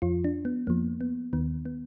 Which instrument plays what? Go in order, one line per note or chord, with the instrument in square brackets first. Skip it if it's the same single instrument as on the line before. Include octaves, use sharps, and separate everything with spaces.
[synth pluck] F2 F3 F4
D4
B3
F2 F3 A#3
B3
D#2 D#3 B3
B3